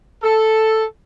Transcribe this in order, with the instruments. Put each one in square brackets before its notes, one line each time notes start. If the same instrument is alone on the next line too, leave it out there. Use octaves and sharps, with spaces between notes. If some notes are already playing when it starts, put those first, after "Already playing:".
[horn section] A4